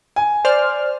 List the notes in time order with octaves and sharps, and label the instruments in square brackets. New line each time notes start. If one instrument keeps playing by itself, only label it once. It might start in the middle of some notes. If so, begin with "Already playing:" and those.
[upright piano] G#5
[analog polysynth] C5 D5 F6